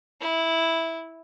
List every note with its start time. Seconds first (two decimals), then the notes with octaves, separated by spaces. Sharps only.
0.21 E4